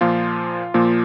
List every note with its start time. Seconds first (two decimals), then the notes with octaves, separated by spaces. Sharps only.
0.01 A#2 F3 A#3 F4
0.74 A#2 F3 A#3